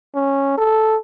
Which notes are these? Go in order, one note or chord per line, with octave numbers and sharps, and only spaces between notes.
C#4
A4